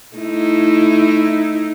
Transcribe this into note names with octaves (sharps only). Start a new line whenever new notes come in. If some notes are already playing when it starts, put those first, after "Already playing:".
A3 D#4 E4